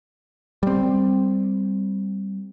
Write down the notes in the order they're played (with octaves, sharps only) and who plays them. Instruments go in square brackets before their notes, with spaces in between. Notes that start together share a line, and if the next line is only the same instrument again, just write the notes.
[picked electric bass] G3 C4